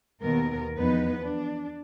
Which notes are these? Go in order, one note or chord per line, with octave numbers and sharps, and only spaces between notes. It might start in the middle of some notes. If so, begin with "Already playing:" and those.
D#2 B2 B3 A#4
E2 F3 B3 D#4 B4
D4